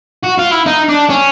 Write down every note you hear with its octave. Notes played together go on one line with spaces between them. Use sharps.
F#4
F4
E4
D#4
D4
C#4